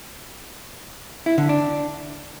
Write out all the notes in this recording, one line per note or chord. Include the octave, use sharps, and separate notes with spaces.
E4
D3
D4